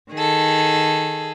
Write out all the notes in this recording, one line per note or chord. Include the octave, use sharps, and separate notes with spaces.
D#3 G#4 A4